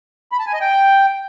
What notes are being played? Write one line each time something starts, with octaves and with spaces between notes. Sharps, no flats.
B5
A5
G#5
D#5
G5